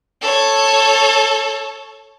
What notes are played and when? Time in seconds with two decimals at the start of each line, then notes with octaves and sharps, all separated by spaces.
0.22 A4 C#5